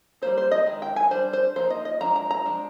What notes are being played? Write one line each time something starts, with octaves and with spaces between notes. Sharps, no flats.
G3 A#3 D#4 C5
C5
D#5
D#3 G#3
G5
G#5
G3 D4 C5
C5
F3 A#3 D#4 C5
D#5
D#5
F3 G#3 D4 A#5
A#5
A#5
F3 G#3 D4